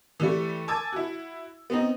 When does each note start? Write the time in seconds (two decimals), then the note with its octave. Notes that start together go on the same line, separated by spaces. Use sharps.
0.20 E3 G3 A3
0.68 G#5 A5 D6 E6 G#6
0.93 E4 F#4
1.70 B3 C4 D#4